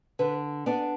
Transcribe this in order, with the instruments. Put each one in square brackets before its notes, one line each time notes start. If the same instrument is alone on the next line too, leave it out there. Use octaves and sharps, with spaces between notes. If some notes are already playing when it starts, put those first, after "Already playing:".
[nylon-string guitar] D3 B4
B3 D4 D5